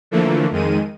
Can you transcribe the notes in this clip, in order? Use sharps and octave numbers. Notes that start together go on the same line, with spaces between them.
D3 E3 F3 A3 A#3
F2 D#3 G#3 D#7